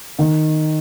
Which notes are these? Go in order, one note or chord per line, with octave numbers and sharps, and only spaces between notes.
D#3